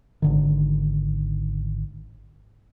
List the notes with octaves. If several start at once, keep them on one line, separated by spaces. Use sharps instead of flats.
G#1 D3 D#3